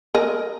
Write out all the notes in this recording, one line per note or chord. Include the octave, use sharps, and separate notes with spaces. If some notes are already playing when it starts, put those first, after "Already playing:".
A#4 D#5